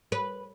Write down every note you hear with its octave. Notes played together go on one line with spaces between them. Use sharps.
B4